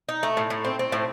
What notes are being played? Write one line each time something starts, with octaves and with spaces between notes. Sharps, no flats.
D#4
A3
A2
A2
C4
C4
A2